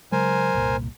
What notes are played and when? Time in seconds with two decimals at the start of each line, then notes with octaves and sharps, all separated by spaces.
0.12 C#3 F#3 G#3 A#4 C5 G#5
0.54 F#1 C2 A#2